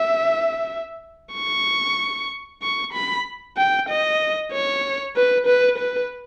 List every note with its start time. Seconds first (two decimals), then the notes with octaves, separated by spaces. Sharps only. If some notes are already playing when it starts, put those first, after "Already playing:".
Already playing: E5
1.35 C#6
2.63 C#6
2.93 B5
3.57 G5
3.89 D#5
4.53 C#5
5.16 B4
5.47 B4
5.78 B4